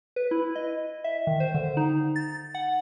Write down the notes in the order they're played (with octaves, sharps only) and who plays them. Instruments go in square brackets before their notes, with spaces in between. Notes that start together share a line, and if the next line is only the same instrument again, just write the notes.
[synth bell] B4
E4
D#5
E5
D#3
C5
D3
D#4
A6
F#5